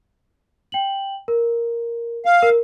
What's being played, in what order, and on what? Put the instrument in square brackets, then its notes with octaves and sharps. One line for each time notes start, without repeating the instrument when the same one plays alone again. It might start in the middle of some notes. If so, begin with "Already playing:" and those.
[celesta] G5 F#7
A#4
[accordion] F5
[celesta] A#4